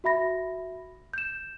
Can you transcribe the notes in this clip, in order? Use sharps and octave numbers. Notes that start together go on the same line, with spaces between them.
F#4 E5 B5 A#6
G6 E7